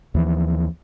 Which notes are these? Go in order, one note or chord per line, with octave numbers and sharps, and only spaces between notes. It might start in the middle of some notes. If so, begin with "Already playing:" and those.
D#2 E3 F3